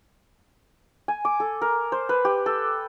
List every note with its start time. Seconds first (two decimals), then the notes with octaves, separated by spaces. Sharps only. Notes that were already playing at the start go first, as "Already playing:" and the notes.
1.08 G#5
1.25 D6
1.40 A4
1.62 A#4
1.92 C5
2.09 B4
2.25 G4
2.46 A4